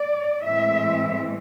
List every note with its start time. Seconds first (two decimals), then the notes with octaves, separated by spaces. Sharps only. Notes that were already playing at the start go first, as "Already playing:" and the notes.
Already playing: D5
0.43 A2 E3 G#3 C4 E5